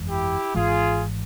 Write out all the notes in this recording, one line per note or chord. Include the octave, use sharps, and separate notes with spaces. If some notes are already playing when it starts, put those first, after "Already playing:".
Already playing: G1 F2 E3 G#3
E4 G4
G#1 G#2 E3 G#3 F4 G#4